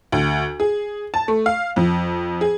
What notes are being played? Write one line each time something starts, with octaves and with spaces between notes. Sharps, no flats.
D2
G#4
A5
A3
F5
F2
G#4